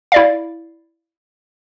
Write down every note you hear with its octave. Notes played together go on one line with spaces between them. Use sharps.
E4 D5 F5